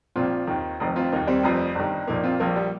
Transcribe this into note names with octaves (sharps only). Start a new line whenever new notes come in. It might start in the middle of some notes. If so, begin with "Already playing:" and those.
A#1 A#2 F3 C4 F4
D#2 D#3
F1 F2 D#3
C4 F4
D#2 D#3 A#3 D#4
G3 C4
F1 F2 F3
G1 G2 D#3
A#1 A#2 F3 A#3 D#4
C4 F4
A#1 A#2 F3 A#3
G3